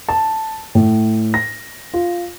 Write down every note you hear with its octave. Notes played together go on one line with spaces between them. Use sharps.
A5
A2
A#6
F4